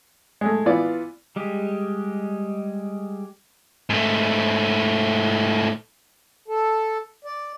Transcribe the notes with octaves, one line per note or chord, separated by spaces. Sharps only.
G#3 A3
E3 B3 F4 D5
G3 G#3 G4
G#2 A3
A4
D5